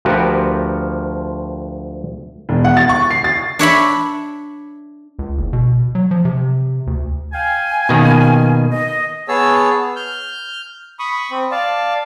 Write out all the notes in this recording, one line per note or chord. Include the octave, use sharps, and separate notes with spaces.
D2 F3 F#4 G4 A#4 B4
E1
F#5
A6
C#6
C7
A6
D4 C#5 E5 B5
C#2
F#1
B2
F#3
F3
C3
D2
F5 G5 G#5
B2 D#3 A#3
D#5
B3 G#4 C#5 A5 E6
F6 G6
B5 C#6 D#6
C4
D5 F5 A5